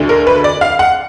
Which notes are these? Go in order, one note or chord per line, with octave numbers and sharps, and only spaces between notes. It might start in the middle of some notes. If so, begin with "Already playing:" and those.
Already playing: D2 D3
A#4
B4
D5
F5
F#5